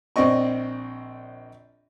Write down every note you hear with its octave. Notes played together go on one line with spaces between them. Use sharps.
A#1 C4 D5 D#5 C#6